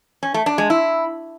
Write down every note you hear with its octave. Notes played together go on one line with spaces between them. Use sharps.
C#4
A3
D4
G#3
E4